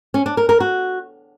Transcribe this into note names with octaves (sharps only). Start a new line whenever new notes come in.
C#4
D4
A#4
A#4
F#4